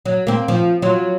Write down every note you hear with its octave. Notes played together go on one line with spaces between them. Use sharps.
F#3
A#3 C4
F3
F#3 F4